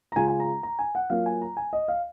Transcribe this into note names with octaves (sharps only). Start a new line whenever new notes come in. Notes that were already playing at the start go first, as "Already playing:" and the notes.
A#5
C#3 G#3 C#4 F4 G#5
G#5
A#5
A#5
G#5
F#5
F#3 A#3 F4 F5
G#5
A#5
G#5
D#5
F5